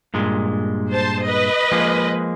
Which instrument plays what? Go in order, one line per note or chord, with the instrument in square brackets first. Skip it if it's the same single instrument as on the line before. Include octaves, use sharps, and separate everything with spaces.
[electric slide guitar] G2 A#2 G#3
[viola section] C5 A5
B4 D#5
[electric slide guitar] F3 G#3 A#3